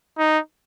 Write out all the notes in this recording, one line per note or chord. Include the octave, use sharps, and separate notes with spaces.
D#4